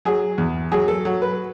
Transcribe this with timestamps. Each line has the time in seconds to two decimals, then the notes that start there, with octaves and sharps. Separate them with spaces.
0.05 F#3 G#4
0.38 E2
0.72 F#3 G#4
0.88 A4
1.05 F#3
1.22 B4